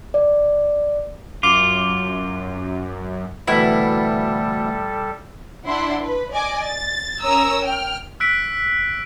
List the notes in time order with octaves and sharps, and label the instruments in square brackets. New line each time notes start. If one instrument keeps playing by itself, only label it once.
[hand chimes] D5
[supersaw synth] F#2 [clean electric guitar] F4 [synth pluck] D6
[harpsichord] D2 B2 E3 [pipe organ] G3 A4 [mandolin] E4
[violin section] D4 E4 F#5 C6
B4
D5 D#5 G#5 D6
A6
C#4 A#4 C#5 A#5 D#6 E6
G5 F6
[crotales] E6 F#6 B6 D7